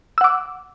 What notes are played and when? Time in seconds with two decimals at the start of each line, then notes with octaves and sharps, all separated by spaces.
0.18 E6
0.21 F#5
0.24 D6